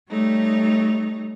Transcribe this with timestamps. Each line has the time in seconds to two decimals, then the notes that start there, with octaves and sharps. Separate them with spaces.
0.10 G3 A3 D#4 C#5